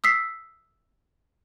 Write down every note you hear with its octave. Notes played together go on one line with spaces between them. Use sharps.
D#6 E6 B6 C7